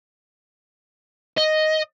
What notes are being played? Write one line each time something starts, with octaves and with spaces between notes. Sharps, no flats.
D#5